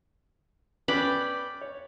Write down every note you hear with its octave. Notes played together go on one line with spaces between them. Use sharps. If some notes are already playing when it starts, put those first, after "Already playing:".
B3 C#4 B4 D5 G5 B5
C#5